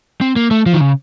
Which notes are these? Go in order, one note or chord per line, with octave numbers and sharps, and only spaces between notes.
C4
A#3
A3
F3
D#3
C#3